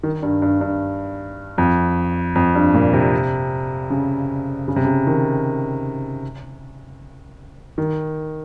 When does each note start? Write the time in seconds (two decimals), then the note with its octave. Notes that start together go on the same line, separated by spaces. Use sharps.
0.03 D#3
0.22 G2
0.42 G2
0.61 G2
1.58 F2
2.35 F2
2.55 G2
2.74 A#2
2.93 C3
3.90 C#3
4.68 C#3
4.76 C3
4.85 C#3
5.07 D#3
7.78 D#3